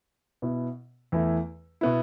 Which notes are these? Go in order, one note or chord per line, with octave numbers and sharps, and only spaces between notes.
B2 B3 E4
E2 E3 A3 E4
B2 B3 E4